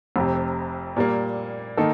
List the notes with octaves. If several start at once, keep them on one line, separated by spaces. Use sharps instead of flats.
F1 F2 C3
A#2 G3 A#3
D#3 A#3 D#4 A4